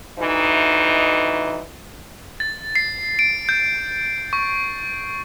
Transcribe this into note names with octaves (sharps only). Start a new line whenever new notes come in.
D2 E3 D#4
A6
C7
D7
G6
C#6